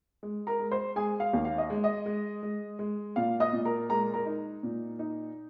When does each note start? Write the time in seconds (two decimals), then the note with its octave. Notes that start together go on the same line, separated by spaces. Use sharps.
0.23 G#3
0.47 A#4 A#5
0.59 G#3
0.71 C5 C6
0.96 G#3 G#4 G#5
1.20 F5
1.33 D#2
1.45 F5
1.58 D#5
1.70 G#3
1.84 D#5
2.06 G#3
2.43 G#3
2.79 G#3
3.16 A#2 F5
3.40 D#5 D#6
3.53 A#2
3.65 A#4 A#5
3.89 G#3 A#4 A#5
4.14 A#4 A#5
4.26 D#4
4.63 A#2
4.99 D#4